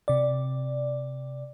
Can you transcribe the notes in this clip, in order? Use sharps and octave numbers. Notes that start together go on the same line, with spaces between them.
C3 D5